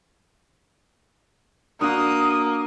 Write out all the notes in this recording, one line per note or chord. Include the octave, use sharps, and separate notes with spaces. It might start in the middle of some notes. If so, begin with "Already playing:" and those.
D3 A#3 F#4 D#6